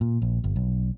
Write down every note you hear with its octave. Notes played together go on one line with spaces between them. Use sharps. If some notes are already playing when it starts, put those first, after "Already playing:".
A#2
A#1
G1
B1